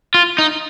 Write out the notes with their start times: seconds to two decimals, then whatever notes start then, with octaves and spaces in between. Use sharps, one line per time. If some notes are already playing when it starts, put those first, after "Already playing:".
0.14 F4
0.38 D#4